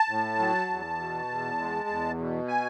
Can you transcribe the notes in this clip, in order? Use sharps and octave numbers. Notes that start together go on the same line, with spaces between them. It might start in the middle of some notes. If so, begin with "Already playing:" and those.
Already playing: A5
A2
F#3
E2
B2
E2
G#3
E2
B2
G#5